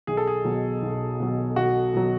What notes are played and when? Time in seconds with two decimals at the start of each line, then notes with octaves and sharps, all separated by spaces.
0.07 B1 G#4
0.17 A4
0.27 G#4
0.45 B2 F#3
0.82 B1
1.20 B2 F#3
1.56 B1 F#4
1.94 B2 F#3